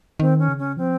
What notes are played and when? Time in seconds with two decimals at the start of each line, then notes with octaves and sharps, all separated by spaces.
0.20 D#3 C4
0.39 C#4
0.48 C#3
0.59 C#4
0.77 F3 C4